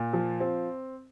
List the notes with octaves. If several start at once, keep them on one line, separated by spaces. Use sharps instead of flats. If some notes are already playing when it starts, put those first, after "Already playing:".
Already playing: A#2
F3
C4